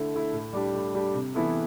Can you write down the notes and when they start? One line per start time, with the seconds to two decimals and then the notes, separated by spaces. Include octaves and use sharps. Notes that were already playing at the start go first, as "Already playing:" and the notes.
Already playing: D3 A3 E4
0.14 A3 E4
0.33 A2
0.53 G3 D4 G4
0.74 A2
0.94 G3 D4 G4
1.14 C3
1.34 E3 B3 E4 A4